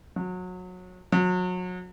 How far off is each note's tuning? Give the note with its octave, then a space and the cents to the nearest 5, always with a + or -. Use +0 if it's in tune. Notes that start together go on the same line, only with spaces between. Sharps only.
F#3 -25
F#3 -30